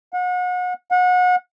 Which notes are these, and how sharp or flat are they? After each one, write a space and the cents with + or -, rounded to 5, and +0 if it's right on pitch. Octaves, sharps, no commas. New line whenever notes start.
F#5 -35
F#5 -30